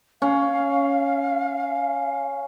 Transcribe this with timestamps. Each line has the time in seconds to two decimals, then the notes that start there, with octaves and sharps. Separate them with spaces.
0.22 C#4 F5